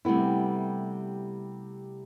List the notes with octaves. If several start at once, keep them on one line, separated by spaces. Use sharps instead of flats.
C3 G3 A3 B3 E4